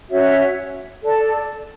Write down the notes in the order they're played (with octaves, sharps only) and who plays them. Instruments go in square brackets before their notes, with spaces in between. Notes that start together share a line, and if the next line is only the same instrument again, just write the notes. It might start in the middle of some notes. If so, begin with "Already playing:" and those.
[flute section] C#4 F#4 C#5 E5
A4 D5 A5